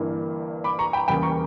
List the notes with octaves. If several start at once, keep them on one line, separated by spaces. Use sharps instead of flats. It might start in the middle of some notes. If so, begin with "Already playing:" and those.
Already playing: G1 G2 E3 A#3
B5 D6
A#5 C#6
G5 B5
E1 E2 C#3 G3 A#3 G5 B5
A#5 C#6